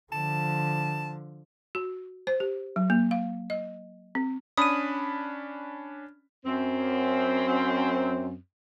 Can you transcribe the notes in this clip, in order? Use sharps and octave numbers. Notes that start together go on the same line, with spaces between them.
D3 F3 A5
F#4
C5
G4
F#3
A#3
F5
D#5
C4
C#4 D4 B5 D#6 D#7
F#2 C4